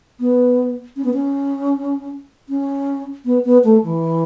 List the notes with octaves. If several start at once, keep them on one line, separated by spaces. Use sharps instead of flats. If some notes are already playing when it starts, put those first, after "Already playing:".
B3
C#4
B3
C#4
C#4
B3
B3
A3
E3